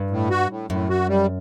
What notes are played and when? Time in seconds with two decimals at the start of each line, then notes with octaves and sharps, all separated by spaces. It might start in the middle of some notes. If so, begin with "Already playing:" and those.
Already playing: G2
0.11 A2
0.30 F#4
0.50 A2
0.70 F#2 A2
0.89 F#4
1.09 G3